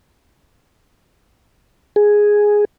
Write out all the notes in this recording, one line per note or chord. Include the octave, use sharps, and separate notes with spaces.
G#4